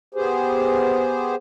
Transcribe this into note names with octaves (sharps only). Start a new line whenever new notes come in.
B3 G4 G#4 C5